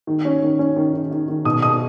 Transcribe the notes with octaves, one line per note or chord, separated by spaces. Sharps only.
D#3
C#4
D#3
C#4
D#3
D#3
D#3
D#3
B2 D#6
B2 D#6